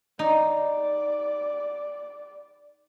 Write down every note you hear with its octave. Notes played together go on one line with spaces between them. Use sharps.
D#4 D5